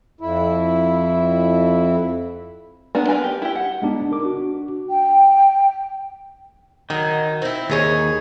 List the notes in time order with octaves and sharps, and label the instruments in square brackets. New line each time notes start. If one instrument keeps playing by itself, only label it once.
[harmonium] F2 E4
[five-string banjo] A#3 B3 D4
A#4 B4 G#5
G4
E4 G4
F#5
[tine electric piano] G#3 B3 D4 D#4
A#4 D6
D4 F#4
[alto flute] G5
[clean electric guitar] D#3 [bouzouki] F#3 D#4
[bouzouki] C4 E4
[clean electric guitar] D#2 [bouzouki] D#4 G#4 C#5